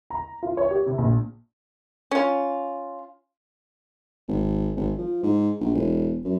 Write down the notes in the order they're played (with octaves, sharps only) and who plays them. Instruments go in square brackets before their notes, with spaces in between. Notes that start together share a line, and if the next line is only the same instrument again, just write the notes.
[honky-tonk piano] A#5
F4
C#5
G4
C3
A#1
[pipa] C#4 F4
[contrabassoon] G#1
G#1
F3
G#2
A#1
E1
F#2